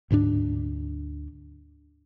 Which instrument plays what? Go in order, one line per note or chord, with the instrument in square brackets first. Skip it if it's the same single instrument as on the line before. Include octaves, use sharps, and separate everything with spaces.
[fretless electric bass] D2 G#2 B3 D4